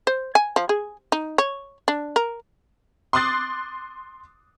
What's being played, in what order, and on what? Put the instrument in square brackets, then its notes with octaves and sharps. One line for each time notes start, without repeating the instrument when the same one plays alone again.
[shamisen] C5
G#5
F3
G#4
D#4
C#5
D4
A#4
[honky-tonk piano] C6 D6 D#6 F#6 A6 C7